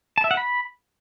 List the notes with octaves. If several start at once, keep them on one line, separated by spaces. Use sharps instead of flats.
A5
E5
F#5
B5